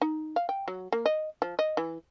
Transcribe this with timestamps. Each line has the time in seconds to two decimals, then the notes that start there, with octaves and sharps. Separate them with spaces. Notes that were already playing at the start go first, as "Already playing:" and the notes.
0.01 D#4
0.36 F5
0.49 G5
0.68 F#3
0.92 A#3
1.06 D#5
1.42 F3
1.59 D#5
1.77 E3